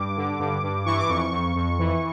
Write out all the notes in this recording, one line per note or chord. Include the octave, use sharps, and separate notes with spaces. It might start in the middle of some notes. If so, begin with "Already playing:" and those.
Already playing: G2 D6
D3
G2
G2
E3 C#6
D6
F2 C#6
F2
F2
E3